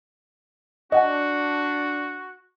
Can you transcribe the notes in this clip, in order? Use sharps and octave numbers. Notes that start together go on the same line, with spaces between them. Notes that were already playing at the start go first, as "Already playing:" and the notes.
D4 F#4 D#5 F#5 G#5